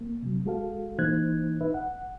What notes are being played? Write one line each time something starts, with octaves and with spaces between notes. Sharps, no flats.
A#3
C3 F#3
G#3 F#4 A4 F5
E3 A#3 D#4 C5 F#6 G#6
D#4 B4 E5
F#5